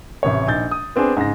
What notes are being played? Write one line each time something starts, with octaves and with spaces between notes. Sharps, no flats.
A1 C3 C#5
A#1 D#4 G6 A6
D#6
B3 C4 D4 G#4
G#2 C#3 A#6